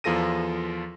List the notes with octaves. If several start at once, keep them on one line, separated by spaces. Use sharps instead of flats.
E2 F3 F4 A4 A#6 D#7